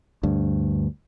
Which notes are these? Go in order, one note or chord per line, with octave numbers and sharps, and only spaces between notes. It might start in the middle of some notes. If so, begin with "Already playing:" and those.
D2 G2